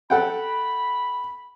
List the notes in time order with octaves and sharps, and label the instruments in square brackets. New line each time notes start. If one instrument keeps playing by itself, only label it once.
[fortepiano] A4 F#5 G5 [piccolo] B5